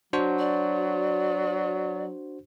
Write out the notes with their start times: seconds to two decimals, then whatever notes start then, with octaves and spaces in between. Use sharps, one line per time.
0.13 F#3 D4 F#4 C5
0.39 D5